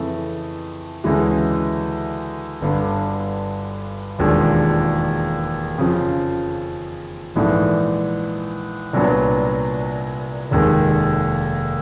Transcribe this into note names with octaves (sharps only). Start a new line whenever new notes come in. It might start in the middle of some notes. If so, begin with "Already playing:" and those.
Already playing: F2 C#3 E3 A3
D2 C#3 E3 G#3
G1 G2 D3
E1 D#2 D3 F3 G#3
F2 C#3 F3
A#1 G#2 E3 A3
C2 A#2 F#3 B3 D4
F1 D#2 D#3 G#3